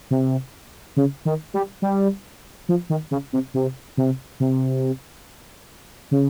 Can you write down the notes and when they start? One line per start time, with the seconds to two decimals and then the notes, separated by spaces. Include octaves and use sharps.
0.11 C3
0.97 C#3
1.25 D#3
1.54 G3
1.82 G3
2.69 F3
2.90 D#3
3.11 C#3
3.33 C3
3.54 C3
3.97 C3
4.40 C3
6.11 C#3